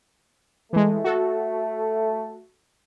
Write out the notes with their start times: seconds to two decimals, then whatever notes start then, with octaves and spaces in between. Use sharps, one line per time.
0.73 E3 G#3 A3
1.04 F#4 A4